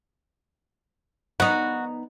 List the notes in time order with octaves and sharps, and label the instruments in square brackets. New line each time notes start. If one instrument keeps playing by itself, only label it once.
[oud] B3 D#4 [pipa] F#4